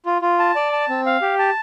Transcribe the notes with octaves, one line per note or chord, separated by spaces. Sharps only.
F4
F4
A5
D5
A5
C4
F5
G4
A5